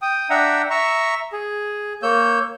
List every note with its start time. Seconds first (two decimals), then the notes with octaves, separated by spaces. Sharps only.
0.02 G5 D#6
0.30 D4 E5 F#5 G5 A#5
0.70 E5 A#5 C#6
1.33 G#4
2.03 A#3 C#5 E6 G6